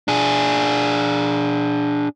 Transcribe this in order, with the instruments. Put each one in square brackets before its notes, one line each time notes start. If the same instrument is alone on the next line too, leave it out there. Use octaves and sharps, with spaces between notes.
[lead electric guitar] D4 G#4